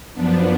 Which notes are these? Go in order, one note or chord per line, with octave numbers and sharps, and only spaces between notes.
F#2 F3 B3 D4